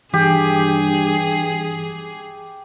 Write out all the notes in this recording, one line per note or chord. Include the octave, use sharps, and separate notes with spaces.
G2 E3 G4 G#4